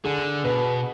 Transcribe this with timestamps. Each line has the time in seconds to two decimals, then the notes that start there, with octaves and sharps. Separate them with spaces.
0.04 D3 G#4
0.44 B2 B4